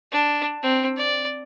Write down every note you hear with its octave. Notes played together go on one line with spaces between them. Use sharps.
D4
C4
D5